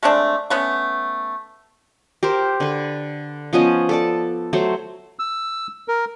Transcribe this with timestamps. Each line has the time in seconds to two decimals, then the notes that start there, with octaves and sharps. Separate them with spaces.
0.03 G#3 A3 C4 D4
0.50 A3 B3 C#4
2.23 G4 A#4 C5
2.60 D3 B4
3.53 F3 B3 C#4 D#5
3.89 A4 D5 A5
4.53 F#3 A3 C5
5.19 E6
5.88 A#4